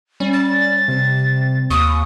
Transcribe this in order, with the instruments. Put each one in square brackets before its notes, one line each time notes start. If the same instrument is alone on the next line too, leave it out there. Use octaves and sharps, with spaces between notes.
[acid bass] G3 [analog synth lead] C#4
[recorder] A6
[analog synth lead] C3
[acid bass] D#2 [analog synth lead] C#6 [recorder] D#6